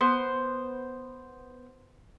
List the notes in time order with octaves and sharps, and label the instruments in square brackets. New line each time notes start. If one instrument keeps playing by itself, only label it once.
[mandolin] B3 C5